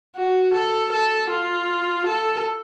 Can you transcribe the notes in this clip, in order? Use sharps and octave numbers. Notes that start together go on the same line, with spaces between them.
F#4
A4
A4
F4
A4